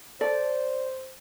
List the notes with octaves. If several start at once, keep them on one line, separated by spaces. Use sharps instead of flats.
A4 C5 D5